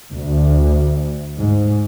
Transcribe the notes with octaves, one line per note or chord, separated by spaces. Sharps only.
D2
G#2